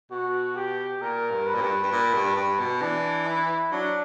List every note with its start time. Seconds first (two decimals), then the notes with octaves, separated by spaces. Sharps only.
0.11 B2 F#4
0.56 G4
1.01 A#2 A#4
1.31 G2
1.46 B4
1.55 A#2
1.61 G2
1.83 G2
1.91 A#2 B4
2.14 G2
2.36 G2 B4
2.59 B2
2.81 E3 D4
3.27 E4
3.72 F#3 D4